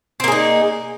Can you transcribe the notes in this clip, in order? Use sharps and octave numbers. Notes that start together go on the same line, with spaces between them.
A#3 C4 D#4 G#4